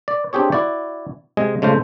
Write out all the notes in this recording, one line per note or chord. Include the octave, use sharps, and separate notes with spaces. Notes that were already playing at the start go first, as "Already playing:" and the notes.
D5
C4 D4 G4 G#4 C#5
E4 F#4 D5
C3 G#3 D#5 G#5
C#3 G#3 A3 F4 C5